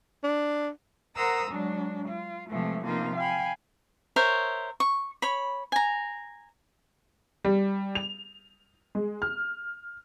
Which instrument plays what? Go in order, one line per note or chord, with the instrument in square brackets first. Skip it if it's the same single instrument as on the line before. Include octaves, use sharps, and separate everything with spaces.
[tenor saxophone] D4
[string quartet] A#4 C5 F#5 A#5 D#6 E6
F#3 G#3 D4
F4
C3 E3 F3 G#3 A3
C3 F3 A#3 B3 D#4 F4
F5 G5 G#5 B5
[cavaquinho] A#4 C5 C#5 E5
C#6
C#5 B5
G#5 A#5
[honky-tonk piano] G3
F7
G#3
F6